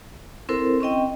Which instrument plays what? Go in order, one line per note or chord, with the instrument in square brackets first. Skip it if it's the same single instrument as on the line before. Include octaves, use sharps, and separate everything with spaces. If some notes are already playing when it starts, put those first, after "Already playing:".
[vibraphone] C4 E4 A4 A#4 C5
C4 C#4 D#5 G5